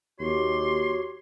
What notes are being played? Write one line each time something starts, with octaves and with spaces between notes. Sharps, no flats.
D#2 F#4 G4 C#5 C6